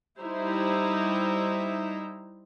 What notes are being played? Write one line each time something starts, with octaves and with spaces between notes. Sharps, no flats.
G3 D#4 E4 C5 E5 A#5